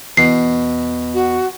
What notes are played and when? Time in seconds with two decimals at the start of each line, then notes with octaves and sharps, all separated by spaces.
0.17 E2 B2 C7
1.14 F#4